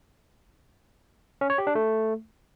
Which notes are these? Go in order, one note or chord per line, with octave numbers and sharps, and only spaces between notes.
C#4
C#5
G4
D4
A3